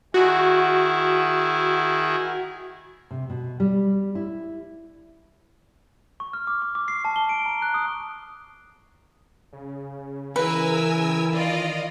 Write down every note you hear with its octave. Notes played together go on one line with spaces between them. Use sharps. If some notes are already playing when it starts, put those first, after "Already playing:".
D#3 E4 F#4 G#4
C3
B2
G3
E4
C#6
F6
D6
C#6
D6
C7
A5
G7
D7
A#5
F#6
D#6
C#3
E3 A#4 B4 G#5 E6
D#3 F4 D5 D#5